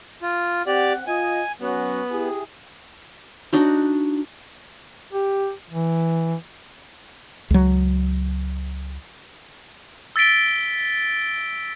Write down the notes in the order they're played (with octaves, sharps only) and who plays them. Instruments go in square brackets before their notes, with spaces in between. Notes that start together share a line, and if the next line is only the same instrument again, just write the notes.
[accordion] F4
[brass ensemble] C4 F#5 [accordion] G4 D5
[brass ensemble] F4 D#5 [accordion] G#5
[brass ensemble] F#3 C#4 F#4 [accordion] B3
[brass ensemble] E4 G4 G#4
[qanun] D4 D#4 F#4
[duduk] G4
E3
[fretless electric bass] C#2 F#3
[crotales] E6 A6 B6 D7 G7